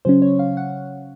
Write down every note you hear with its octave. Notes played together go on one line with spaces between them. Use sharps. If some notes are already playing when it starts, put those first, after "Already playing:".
C#3 F#3 C#4 C5
C#5
F5
F#5